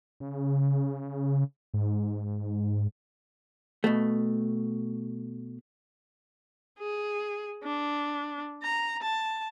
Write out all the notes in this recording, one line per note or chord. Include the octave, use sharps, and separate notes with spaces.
C#3
G#2
B2 A3
G#4
D4
A#5
A5